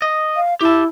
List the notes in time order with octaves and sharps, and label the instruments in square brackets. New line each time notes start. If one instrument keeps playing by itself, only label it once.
[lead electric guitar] D#5
[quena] F5
[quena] E4 [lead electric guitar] G4 A5